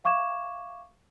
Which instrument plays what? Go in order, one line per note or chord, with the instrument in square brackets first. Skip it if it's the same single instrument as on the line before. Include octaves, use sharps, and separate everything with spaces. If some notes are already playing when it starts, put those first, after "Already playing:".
[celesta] E5 F5 C#6 D6 G#6 E7